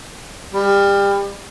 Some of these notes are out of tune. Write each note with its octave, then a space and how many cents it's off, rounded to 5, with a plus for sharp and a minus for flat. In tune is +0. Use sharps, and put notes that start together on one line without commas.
G3 +25